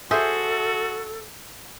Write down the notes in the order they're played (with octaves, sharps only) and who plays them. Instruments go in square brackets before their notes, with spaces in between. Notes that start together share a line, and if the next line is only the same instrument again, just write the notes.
[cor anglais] F#4 [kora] G#4 C5 E5 [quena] A4